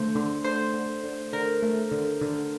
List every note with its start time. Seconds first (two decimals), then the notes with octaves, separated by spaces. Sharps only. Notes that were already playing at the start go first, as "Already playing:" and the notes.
Already playing: D3 A3 C5
0.15 D3
0.44 D3 C5
0.74 D3
1.04 D3
1.33 D3 A#4
1.62 A3
1.91 D3
2.21 D3